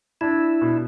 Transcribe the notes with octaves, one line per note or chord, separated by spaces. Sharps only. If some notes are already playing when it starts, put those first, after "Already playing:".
D4 E4
B2